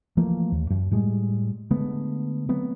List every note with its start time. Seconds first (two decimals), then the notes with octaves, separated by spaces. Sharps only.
0.17 E3 F3 A3 A#3
0.52 D#2
0.70 F#2
0.91 A2 G3 G#3
1.70 D3 G#3 A3 B3
2.49 F#3 A3 B3 C4